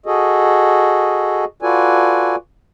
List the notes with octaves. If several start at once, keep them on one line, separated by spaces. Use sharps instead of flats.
F#4 G#4 A4 D#5
F4 F#4 A4 B4 D5 G#5